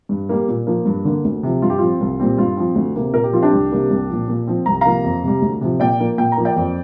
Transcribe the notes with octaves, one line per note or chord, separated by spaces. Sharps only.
G2
G3 A#3
A#2
F3 A#3
G2
D3 A#3
D2
C3 F3
G2 F4
G4
F3 C4 F4
C2
A#2 G3 C4
G2 F4
F3 C4
D2
C3 A#3
A#2 A#4
G4
F3 C4 F4
D4 G4
C2
C3 G3 A#3
C2
A#2 F3
A#2
F3 C4
C2 A#5
C3 F3 A#3 F5 A#5
F2
C3 G3
D2
C3 F3
A#2 D5 G5
F3 A#3
A#2 G5
A#5
F3 A#3
D5 G5
F2